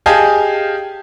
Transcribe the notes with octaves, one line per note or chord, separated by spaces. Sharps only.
G4 G#4 D#5 F5 G#5 A5